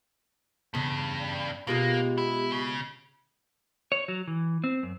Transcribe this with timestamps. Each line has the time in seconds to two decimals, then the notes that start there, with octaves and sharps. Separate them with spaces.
0.74 E2 G2 C#3
1.21 D5
1.67 B2 G#3 A#3 F4 G4
2.18 E4
2.52 C#3
3.92 C#5
4.08 F#3
4.27 E3
4.64 C4
4.83 F#2